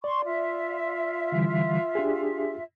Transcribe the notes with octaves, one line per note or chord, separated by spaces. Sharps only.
D5 C6 C#6
F4 E5
D3 E3 G3
D4 G4 G#4